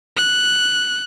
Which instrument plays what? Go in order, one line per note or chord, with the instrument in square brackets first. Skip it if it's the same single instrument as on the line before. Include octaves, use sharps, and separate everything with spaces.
[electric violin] F#6